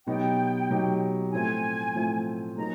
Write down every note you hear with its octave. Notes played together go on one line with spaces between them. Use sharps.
B2 F#3 B3 D#4 G4 G5
B2 F#3 B3 D#4 G4
A2 F3 A3 C4 G#5
A2 F3 A3 C4
F#3 A#3 D#4 G#4 C#5 A#5